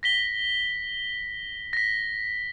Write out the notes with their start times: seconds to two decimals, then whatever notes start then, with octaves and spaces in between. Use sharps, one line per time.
0.03 A#6 B6 G7
1.73 A#6 B6